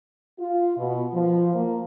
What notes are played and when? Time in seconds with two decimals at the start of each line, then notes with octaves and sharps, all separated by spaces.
0.40 F4
0.78 B2
1.14 F3
1.54 A#3